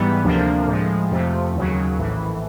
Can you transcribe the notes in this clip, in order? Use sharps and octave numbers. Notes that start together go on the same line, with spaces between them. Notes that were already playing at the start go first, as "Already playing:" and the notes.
Already playing: G#2 E3 G3 B3
D2 C3 F3 A#3 D4
A2 F3 G#3
F2 C3 F3 A3
D#2 C#3 F#3
A#1 A2 E3